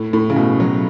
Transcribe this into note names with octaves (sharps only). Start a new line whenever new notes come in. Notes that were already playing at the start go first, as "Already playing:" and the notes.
Already playing: A2
A2
C#3
B2
F#3